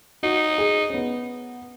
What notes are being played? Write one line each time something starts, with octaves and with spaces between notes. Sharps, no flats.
D#4 F#4
G#4
C#4
B3